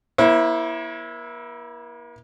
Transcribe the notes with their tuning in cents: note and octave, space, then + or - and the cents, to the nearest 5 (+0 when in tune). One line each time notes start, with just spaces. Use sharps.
A#3 +45 E4 +0 C5 +45